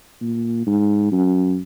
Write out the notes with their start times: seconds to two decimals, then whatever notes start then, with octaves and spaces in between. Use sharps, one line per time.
0.22 A#2
0.67 G#2
1.12 F#2